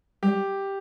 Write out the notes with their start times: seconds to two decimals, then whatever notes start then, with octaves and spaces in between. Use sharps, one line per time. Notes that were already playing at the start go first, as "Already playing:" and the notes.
0.23 G3 G4